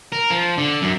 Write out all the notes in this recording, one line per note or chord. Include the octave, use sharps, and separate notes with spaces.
A#4
F3
D3
F#2